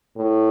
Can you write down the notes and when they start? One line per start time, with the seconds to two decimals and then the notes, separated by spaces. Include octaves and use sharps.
0.18 A2